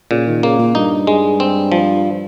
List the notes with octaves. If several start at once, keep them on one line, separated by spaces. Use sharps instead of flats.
A#2 C#3
D#3
C#3 A#3
A#2
G2 D#4
G2 G#3
C4
F3